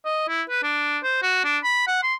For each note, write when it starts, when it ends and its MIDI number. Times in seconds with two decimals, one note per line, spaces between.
0.06 0.28 75
0.28 0.43 64
0.50 0.63 71
0.63 0.98 62
1.03 1.22 72
1.23 1.41 66
1.45 1.58 62
1.64 1.85 83
1.88 2.00 78
2.03 2.15 84